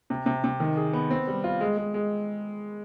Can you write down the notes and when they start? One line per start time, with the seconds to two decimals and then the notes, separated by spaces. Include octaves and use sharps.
0.10 C3
0.26 C3
0.44 C3
0.60 D#3
0.76 G#4
0.93 B3
1.10 C4
1.27 G3
1.44 F4
1.61 G#3
1.77 G#3
1.94 G#3